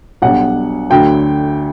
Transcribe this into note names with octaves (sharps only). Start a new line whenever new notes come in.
B1 B2 G3 D4 F#5
D2 D3 F#3 G5